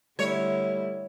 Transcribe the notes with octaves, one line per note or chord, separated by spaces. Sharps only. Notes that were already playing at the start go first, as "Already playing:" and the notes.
D3 G3 A3 E4 C#5